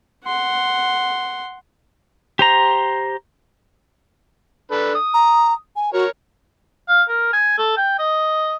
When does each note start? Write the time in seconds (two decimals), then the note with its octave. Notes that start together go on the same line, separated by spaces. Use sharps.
0.25 F#5 C6
2.39 G4 C5 A#5
4.72 D4 A4 B4
4.95 D#6
5.14 A#5
5.76 G#5
5.93 F#4 A#4 C#5
6.88 F5
7.09 A#4
7.33 G#5
7.58 A4
7.77 G5
7.99 D#5